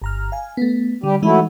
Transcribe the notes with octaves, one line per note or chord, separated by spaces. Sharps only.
G1 A#5 F6
F5 G#5
A3 B3
D3 G3 G4
E3 F#3 G#3 A3 D#4 E4